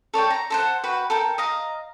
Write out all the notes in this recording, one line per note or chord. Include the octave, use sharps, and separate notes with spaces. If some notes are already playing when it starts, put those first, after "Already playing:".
A4 C#5 D5 G5
A#5
A4 C5 F#5
F#4 B4 G5 B5
A4 A#4 G5
D#5 F5 A#5